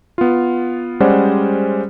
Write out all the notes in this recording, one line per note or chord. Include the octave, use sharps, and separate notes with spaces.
B3 F4
G3 G#3 C#4 C5 D5 F#5